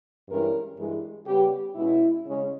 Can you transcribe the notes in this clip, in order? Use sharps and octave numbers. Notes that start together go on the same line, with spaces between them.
G2 E3 G#3 C#4 A#4
G2 E3 G#3
C#3 G3 B3 G4
B2 G#3 C#4 E4
C#3 G#3 C#4